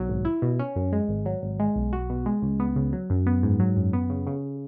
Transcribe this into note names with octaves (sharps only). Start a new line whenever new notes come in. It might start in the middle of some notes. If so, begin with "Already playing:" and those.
Already playing: B1 F#3
G#1
E4
B2
C#4
F#2
G#3
G#1
F#3
G#1
G#3
B1
F#4
B2
G#3
C#2
B3
C#3
F#3
F#2
B3
G#2
F#3
F#2
B3
C#3
C#3